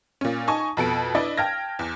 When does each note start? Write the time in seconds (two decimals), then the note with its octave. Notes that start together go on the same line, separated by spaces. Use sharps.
0.21 A#2 C#4
0.47 D#4 G#5 A5 C#6
0.77 F2 B2 A4 D7
1.15 D4 E4 B4 D5 D#5
1.37 G5 A5 F6 G#6 A#6
1.79 E2